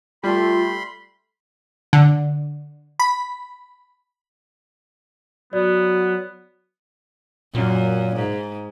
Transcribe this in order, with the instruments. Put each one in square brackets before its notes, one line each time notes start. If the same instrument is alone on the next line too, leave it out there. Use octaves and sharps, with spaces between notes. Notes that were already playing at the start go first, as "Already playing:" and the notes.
[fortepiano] G3 [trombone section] A3 [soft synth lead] F4 [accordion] B5 C6
[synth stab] D3
B5
[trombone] F#3 [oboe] B3 [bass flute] F#4 [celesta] D5
[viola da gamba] F#2 [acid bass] A#2
[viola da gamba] G#2